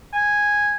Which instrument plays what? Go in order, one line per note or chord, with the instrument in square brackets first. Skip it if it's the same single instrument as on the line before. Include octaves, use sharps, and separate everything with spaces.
[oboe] G#5